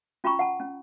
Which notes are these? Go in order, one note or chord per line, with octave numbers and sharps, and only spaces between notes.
C#4 F4 G5 A#5 B5 C#6
F#5 A5
C#4